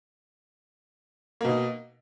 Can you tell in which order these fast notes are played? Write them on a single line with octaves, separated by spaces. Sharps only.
A#3 B2 D#4